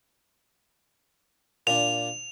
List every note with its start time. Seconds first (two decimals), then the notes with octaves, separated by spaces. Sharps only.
1.67 A#2 D4 F7